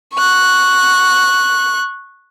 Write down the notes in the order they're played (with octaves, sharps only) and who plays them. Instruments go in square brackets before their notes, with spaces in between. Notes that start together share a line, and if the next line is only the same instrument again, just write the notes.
[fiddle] C#6 F#6